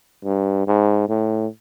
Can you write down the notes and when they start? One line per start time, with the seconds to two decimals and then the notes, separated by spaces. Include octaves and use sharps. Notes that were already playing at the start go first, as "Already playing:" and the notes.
0.25 G2
0.67 G#2
1.09 A2